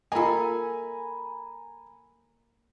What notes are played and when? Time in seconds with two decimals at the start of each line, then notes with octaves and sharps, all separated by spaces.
0.12 A#3 F4 A4 D#5 G#5 A#5 B5